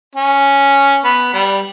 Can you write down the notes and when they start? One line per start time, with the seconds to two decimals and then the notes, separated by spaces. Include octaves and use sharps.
0.15 C#4
1.04 B3
1.34 G3